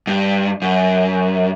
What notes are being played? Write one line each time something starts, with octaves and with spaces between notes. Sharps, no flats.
G2
F#2